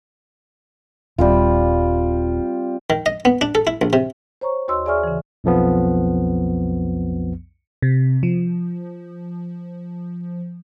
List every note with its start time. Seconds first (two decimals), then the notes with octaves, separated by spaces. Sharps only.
1.18 D#1 G3 C4 F4
2.90 D#3
3.06 D#5
3.25 B3
3.41 D4
3.55 A4
3.67 E4
3.82 A#1
3.93 C3
4.41 C5 C#5 A#5 C#6
4.68 D#2 F#4 C#5 D#5 C6 E6
4.86 G#4 D5 E5 G#5 C#6 F6
5.04 C#3 E3
5.44 B1 F2 F3 B3
7.82 C3
8.23 F3